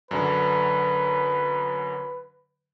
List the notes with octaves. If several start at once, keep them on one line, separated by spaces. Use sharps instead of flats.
F#2 D3 F#3 B4